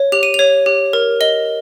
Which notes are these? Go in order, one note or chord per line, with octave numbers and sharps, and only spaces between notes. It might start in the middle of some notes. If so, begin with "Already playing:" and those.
Already playing: C#5
G4 F7
D#7
F7
C#5
G4
A#4
D#5 G7